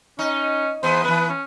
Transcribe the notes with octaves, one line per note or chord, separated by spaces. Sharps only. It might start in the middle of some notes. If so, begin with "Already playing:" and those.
C#4 D#4
E2 B3 C5
E3 B3 B4
C#4